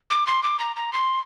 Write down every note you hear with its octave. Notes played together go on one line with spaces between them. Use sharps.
D6
C6
D6
A#5
A#5
C6